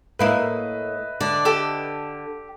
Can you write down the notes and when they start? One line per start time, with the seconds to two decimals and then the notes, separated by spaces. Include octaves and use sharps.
0.19 A2 A#3 E4 B4 D#5 E5
1.21 D3 D5
1.45 G4 A4